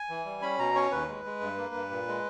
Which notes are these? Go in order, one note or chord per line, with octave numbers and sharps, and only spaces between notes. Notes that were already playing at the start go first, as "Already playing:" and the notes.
Already playing: G#5
E3
G3
C#4 B5
B2 A#5
C#4 C#5
D#2 B4
G#3
G#3
G2
A#3
G2
A#2
G#3